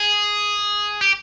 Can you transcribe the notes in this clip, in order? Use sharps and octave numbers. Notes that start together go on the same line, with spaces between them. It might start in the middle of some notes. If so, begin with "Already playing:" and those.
Already playing: G#4
G4